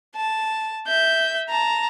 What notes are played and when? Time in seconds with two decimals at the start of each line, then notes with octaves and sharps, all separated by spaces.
0.15 A5
0.87 E5 G6
1.49 A5 A#5